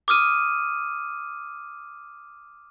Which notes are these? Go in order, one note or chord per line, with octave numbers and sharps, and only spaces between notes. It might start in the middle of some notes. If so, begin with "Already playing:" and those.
D6 D#6 F6 D#7